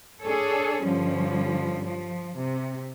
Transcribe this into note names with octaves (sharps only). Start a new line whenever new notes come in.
D4 G#4 A4 C#5
G2 D3 F3 G3 C#4
F3
C3